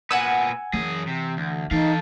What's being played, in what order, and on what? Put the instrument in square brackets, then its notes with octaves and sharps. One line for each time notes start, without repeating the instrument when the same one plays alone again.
[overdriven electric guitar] A#2 B3 [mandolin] F#5 G#5 E6
[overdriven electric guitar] F#2 G#4 [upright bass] E3
[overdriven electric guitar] C3
D2
[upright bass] E3 [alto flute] D#4 [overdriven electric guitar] A4 F5